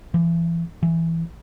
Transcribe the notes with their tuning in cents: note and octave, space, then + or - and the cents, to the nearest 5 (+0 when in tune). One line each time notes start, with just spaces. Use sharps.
E3 +30
E3 +5